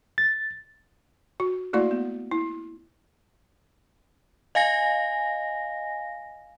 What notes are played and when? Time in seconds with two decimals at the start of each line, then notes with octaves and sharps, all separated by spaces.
0.18 A6
1.40 F#4
1.73 A3 A#3 E4 F#4 D5
1.91 B3
2.31 E4
4.55 D#5 F5 G#5 A#6